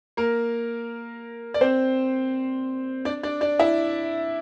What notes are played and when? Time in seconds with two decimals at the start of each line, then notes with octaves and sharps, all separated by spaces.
0.17 A#3 A#4
1.54 D5
1.61 C4 C5
3.05 D4 D5
3.23 D4 D5
3.41 D4 D5
3.59 E4 E5